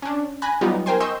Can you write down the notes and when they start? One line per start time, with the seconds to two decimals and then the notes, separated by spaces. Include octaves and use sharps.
0.02 C#4 D4
0.42 G#5 B5 F#6 A#6
0.61 F#3 G3 B3 D#4 F4 G4
0.86 A#4 C5 G5 G#5 C6
1.00 D#5 C6 C#6 E6 G6